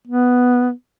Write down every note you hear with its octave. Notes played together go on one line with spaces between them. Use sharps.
B3